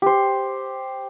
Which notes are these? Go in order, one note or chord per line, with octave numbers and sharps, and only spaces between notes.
G4 C5